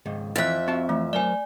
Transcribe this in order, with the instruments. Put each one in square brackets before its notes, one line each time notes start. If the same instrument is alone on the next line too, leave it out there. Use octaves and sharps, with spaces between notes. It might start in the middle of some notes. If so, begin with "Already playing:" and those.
[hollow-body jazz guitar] C#2 G#2 D#3
[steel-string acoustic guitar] F2 E5 [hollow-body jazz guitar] E3 [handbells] F#6 A6
[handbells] C4 [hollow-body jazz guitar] F#4 A5
[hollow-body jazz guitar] E3 [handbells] A3
[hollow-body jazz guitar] F#3 A#4 C5 [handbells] D5 G#5